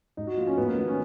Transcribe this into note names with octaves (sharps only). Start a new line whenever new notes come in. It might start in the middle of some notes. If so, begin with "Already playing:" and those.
G#2 D#4
F#4
F3 A#3 F4
C#4
G#2 B3
A#3
D#3 A#3 B3
C#4